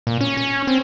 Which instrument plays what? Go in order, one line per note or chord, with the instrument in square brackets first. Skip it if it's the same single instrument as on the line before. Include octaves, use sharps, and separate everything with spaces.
[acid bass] A#2
C#4
C#4
C4